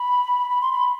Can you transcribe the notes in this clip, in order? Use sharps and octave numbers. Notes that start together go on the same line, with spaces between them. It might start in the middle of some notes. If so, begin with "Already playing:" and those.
Already playing: B5
B5
C6
B5